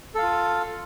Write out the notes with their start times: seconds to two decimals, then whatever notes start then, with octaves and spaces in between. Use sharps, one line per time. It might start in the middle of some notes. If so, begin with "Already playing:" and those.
0.15 A4
0.19 F5
0.22 F4